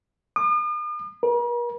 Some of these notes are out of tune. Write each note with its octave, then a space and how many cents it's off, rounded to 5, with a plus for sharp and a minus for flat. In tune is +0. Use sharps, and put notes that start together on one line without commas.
D#6 -45
A#4 +45